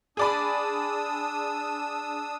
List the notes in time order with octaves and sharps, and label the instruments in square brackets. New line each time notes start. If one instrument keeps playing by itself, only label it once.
[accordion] D4 D#6 E6 [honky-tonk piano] G#4 D5 B5